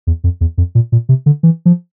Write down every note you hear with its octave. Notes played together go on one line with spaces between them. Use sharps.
E2
F2
E2
F2
A#2
A#2
C3
D3
E3
F3